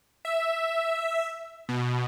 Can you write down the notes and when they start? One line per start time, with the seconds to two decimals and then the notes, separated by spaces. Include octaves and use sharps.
0.25 E5
1.69 B2